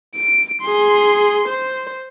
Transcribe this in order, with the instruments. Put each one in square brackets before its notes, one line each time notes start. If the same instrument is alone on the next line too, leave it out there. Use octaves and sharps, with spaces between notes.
[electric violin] D7
G#4 C6
C5